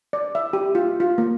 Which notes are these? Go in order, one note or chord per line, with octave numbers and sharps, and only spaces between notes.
D5
E5
G4
F4
F4
A#3